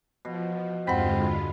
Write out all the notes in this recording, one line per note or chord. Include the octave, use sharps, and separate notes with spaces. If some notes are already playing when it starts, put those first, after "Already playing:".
B2 F3
E2 G2 D3 G#3 C4 F4 F#5 B5